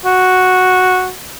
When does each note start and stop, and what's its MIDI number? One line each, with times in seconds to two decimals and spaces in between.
0.05 1.10 66